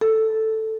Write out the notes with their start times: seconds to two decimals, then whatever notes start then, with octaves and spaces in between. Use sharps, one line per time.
0.01 A4